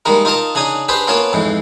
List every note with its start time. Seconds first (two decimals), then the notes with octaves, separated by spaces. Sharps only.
0.05 D#3 G3 G#3 A#3 D#4
0.25 D#4 F4 A#4 D#5 A5 A#5
0.55 C#3 D4 D#4 G#5 D#6
0.88 D4 G4 G#4 B4 C5
1.07 A#3 B3 C#4 F4 C#5 A5
1.33 F2 G#2 E3